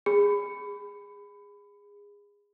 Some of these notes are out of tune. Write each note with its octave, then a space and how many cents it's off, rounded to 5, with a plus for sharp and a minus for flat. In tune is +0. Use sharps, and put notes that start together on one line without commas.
G#4 -25 B5 +20